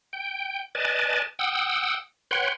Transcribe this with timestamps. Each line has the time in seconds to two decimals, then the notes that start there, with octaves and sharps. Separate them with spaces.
0.13 G5
0.75 B4 D5 D#5 G#5 A5
1.39 F#5 G5 D#6 E6
2.31 B4 C#5 F#5 G5 C6